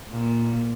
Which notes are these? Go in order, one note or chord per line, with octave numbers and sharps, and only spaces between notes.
A#2